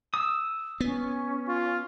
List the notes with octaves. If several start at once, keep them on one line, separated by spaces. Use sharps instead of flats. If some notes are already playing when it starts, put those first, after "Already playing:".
D#6 E6
B3 C#4
F4